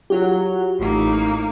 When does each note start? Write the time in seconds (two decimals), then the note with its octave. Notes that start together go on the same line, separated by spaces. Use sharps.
0.10 F#3 F4 G4
0.79 A1 A2 A#3 D#4